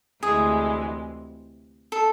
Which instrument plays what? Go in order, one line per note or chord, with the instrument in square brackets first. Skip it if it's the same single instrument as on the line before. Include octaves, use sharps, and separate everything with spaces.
[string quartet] D2 C3 E3 G#3 [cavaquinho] G#4
[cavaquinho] A4